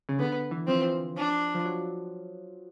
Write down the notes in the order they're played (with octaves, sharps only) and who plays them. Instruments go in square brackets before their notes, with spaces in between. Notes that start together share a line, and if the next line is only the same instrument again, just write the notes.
[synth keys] C#3
[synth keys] D3 [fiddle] B3
[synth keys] E3
[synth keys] F3 [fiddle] C4
[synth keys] E3
F3
[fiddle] D4
[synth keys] F3
F#3